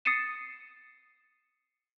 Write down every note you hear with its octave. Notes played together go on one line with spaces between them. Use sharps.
D#6 A6 C7 C#7 D#7 E7